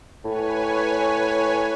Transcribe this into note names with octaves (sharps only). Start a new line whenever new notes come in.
A2 B4 C#5 G#5